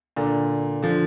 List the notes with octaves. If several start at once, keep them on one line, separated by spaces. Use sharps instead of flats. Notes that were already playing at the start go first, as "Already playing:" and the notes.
A#2 D3
D3 F3